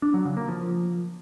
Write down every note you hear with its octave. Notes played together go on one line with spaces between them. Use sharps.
D4
F#3
C#3
A#3
F3